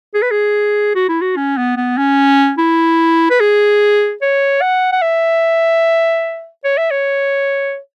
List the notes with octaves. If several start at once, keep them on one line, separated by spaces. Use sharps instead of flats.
G#4
B4
G#4
F#4
E4
F#4
C#4
B3
B3
C#4
E4
B4
G#4
C#5
F#5
F#5
E5
C#5
E5
C#5